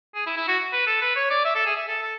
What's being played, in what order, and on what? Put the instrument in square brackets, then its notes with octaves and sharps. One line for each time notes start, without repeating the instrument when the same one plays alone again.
[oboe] G#4
E4
E4
F#4
B4
A4
B4
C#5
D5
E5
A4
G#4
E5
A4
A4